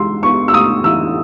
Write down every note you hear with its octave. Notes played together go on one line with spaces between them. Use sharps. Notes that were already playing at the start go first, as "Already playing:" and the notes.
Already playing: E3 G#3 C6 E6
B3 C#6
E6
A2 D#6
E3 E6